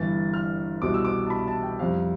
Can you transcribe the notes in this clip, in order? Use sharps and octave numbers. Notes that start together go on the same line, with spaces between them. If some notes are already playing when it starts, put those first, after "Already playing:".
Already playing: G1 G2 E3 A6
F6
C2 B2 G3 D6
E6
D6
A5
B5
A5
G5
F2 C3 G3 F5